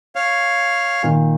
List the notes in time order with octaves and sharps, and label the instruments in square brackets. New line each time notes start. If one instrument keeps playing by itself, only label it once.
[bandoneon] C#5 F5
[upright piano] A#2 D#3